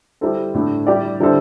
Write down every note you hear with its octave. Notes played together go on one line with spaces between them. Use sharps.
G3 E4 A4 C5
A2 A3 D4
G3 E4 G4 D5
D3 G3 E4 A4 C5